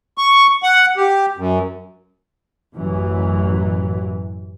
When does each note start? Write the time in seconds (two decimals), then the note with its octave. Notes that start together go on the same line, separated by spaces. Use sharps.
0.18 C#6
0.63 F#5
0.97 G4
1.37 F#2
2.75 A1 F#2 E3 F#3